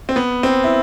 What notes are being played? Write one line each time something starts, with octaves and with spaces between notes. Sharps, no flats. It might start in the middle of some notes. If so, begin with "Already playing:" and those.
C4
B3
C4
E4